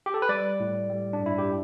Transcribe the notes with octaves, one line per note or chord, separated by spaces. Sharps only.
G4
A4
B4
G3 D5
A2
G3
D4
G2
E4
G4